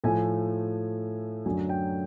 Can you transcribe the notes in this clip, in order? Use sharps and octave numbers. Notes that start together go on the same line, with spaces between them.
A2 F3 A3 G#5
F#2 D3 F#3 A3 G#5
G5